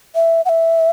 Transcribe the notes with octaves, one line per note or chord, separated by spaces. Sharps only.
E5
F#5
E5